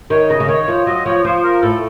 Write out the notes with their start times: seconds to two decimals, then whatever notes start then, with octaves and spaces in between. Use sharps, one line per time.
0.10 D#3 C#5
0.30 C#3 D#5
0.40 C#3
0.48 D#3 C#5
0.68 F3
0.87 F#3 D#5
1.05 F3 C#5
1.25 F3 C5
1.43 A#4
1.62 A2 A4